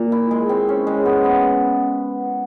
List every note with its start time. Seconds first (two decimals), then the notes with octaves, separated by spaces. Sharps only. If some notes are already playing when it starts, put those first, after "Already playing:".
Already playing: A#2
0.12 E4
0.31 G#3
0.49 C4
0.69 C#4
0.87 G#3
1.06 B3
1.24 B3